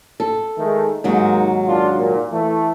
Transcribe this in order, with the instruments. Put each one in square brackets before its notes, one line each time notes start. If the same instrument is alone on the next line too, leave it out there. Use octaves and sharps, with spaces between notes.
[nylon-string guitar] A4
[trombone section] D#3 G#3 A3
[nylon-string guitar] D#2 G#2 F#3 [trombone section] G#3 A#3 D#4
[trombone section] A#2 D4 F4
A#2
E3 A3